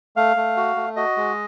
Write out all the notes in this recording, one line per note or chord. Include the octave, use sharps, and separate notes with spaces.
A3 F5
A3
F#4
A3
F#4 D#5
G#3